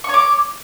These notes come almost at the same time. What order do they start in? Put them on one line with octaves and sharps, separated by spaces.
C#6 C#5 D6